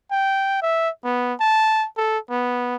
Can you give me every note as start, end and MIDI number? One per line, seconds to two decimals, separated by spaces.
0.11 0.57 79
0.62 0.90 76
1.05 1.34 59
1.40 1.87 81
1.97 2.18 69
2.30 2.76 59